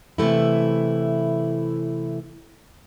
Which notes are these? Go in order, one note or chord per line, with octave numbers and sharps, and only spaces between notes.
C3 E3 A3 E4